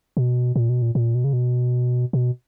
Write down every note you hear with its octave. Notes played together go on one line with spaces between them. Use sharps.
B2
A#2
B2
A#2
A#2
B2
C#3
B2
B2